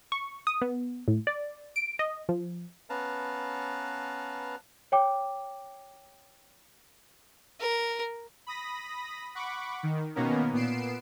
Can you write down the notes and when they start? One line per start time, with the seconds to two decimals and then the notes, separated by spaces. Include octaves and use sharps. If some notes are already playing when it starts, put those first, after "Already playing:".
0.12 C#6
0.47 D#6
0.62 B3
1.08 A2
1.27 D5
1.76 D7
1.99 D#5
2.29 F3
2.90 B3 C#4 B4 F5 A5 A#5
4.92 C#5 G5 D6
7.60 A#4
8.47 B5 D#6 A#6
9.35 F#5 B5 C#6 D6
9.83 D#3
10.15 B2 D#3 A#3 B3 C#4 A#4
10.53 A#2 B3 C7 D7 E7